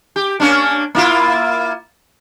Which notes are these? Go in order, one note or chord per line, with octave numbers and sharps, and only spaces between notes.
G4
A#3 C#4 D4
A#3 E4 F4